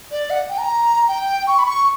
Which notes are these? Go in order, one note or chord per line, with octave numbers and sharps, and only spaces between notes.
D5
F#5
G5
A#5
G5
C#6
B5
C#6